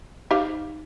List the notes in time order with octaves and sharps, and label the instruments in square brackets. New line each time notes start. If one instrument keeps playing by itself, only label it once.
[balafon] D#4 [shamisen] G4 C5 F5